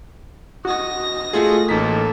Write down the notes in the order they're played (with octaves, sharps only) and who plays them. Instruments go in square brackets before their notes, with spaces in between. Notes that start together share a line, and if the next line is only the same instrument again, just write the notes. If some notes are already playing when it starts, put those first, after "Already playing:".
[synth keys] F#4 [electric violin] D#5 A#6
[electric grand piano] A3 F4 G#4
[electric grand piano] A1 D#4 B6 [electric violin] A#3 A4